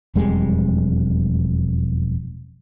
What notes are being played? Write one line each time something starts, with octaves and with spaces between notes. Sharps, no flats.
E1 F2 G3 G#3